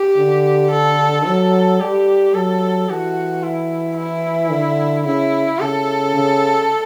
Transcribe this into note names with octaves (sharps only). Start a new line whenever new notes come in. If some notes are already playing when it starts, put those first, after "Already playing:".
Already playing: G4
D3
A4
F#3 A4
G3 G4
F#3 A4
E3 F#4
E4
E4
D3
C#3 E4
C#3 A4
C#3